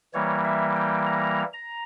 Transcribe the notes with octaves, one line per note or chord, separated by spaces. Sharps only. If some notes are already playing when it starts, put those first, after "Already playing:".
E3 G3 A#3 C#5
E5
G5
A#5
A#5